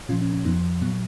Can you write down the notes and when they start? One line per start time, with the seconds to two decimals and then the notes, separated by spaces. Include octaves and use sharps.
0.09 A#2 C#4 F4
0.12 F3
0.21 C#4
0.33 C#4
0.45 F2 F3 B3 D#4
0.82 A#2 F#3 B3